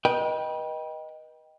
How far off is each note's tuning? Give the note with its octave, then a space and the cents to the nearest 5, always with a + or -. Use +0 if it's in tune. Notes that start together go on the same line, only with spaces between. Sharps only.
B4 -35 D#5 +0 G5 +0